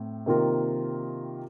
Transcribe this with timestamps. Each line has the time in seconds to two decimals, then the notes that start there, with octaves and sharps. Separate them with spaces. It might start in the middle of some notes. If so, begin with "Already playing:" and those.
Already playing: A2 C4
0.26 C3 D#3 A#3 F4 A#4